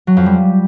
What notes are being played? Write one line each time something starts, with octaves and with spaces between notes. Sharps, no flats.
F#3
F2
G3